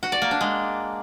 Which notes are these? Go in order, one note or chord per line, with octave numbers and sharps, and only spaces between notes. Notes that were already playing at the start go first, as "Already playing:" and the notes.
F#4
D5
A#3
D4
G#3